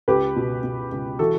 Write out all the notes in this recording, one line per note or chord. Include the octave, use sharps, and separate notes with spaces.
C#2 G4 B4
B2
B2
C#2
E3 F#4 A4